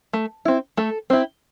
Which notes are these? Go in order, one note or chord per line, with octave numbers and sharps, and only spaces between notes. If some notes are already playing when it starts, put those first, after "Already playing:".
A3
C4 E4
A3 A4
C4 E4